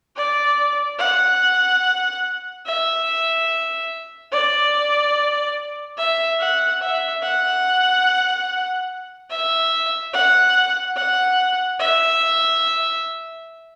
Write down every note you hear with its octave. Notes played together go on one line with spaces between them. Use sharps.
D5
F#5
E5
D5
E5
F#5
E5
F#5
E5
F#5
F#5
E5